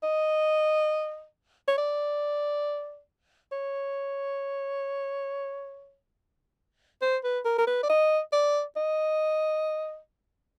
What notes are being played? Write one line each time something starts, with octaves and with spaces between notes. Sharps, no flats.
D#5
C#5
D5
C#5
C5
B4
A#4
A#4
B4
D5
D#5
D5
D#5